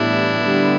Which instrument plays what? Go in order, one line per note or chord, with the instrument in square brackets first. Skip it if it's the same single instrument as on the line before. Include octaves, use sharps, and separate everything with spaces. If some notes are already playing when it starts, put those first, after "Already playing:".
Already playing: [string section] A2 E3 G3 B3 [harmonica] D4 E4
[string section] D3 G3 B3